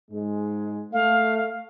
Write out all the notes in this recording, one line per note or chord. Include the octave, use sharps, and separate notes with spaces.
G#2 G#3
A3 F5